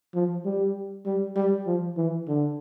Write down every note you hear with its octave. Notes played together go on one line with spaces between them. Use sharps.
F3
G3
G3
G3
F3
E3
D3